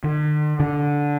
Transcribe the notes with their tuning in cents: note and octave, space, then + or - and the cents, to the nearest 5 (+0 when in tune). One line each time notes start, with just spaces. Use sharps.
D3 +45
D3 -10